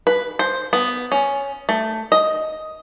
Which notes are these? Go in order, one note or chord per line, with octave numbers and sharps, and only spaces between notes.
B4
C5
B3
C#4
A3
D#5